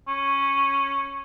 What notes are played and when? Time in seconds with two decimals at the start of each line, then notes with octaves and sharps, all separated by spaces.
0.08 C#4